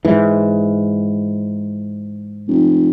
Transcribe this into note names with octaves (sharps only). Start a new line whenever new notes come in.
G#2 E3
F1